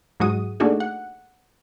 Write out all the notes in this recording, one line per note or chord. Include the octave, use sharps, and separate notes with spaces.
G#2 F#3 G#3 F#4 D#6
A3 A#3 D4 D#4 F#4 G#4
F#5